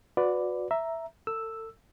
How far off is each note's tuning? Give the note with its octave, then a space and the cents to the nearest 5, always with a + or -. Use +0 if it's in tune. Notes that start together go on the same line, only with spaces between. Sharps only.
F#4 -25 B4 +15 D5 +0
E5 +0 A#5 +0
A4 +35 E6 +0